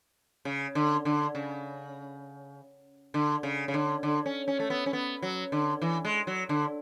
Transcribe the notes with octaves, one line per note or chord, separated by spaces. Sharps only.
C#3
D3
D3
C#3
D3
C#3
C#3
D3
D3
C#4
C#4
A3
B3
C#4
B3
F#3
D3
E3
G#3
F#3
D3